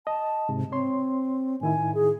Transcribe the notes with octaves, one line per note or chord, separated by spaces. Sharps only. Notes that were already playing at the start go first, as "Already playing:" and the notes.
D#5 A5
G#2 C3
C4 C#5 C6
A2 D#3 E4 G#5
G#4